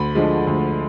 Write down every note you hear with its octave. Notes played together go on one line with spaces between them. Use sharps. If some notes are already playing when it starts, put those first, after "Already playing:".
Already playing: D2 B5
D3 F3 G#3
D2